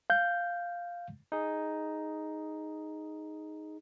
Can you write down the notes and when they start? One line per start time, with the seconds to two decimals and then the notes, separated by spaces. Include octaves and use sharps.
0.10 F5 G6
1.32 D#4 G#4